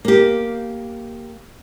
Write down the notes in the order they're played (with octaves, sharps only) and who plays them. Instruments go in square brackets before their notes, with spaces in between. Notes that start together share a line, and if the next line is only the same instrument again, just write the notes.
[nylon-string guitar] A#3 G4